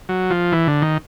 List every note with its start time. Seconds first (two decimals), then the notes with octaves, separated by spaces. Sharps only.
0.09 F#3
0.30 F3
0.52 E3
0.68 D3
0.82 D#3